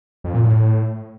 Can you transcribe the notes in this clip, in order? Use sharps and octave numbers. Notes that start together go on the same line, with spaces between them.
F2
A#2
A2